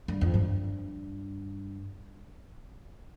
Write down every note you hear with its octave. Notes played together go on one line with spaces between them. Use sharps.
G2
F2
G2